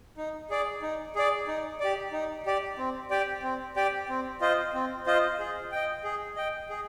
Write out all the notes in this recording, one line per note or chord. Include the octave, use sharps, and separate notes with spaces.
D#4
G#4 D5
D#4
G#4 D5
D#4
G4 D5
D#4
G4 D5
C4
G4 D5 G5
C4
G4 D5 G5
C4
F4 C5 D#5
C4
F4 C5 D#5
G#4
D#5 G5
G#4
D#5 G5
G#4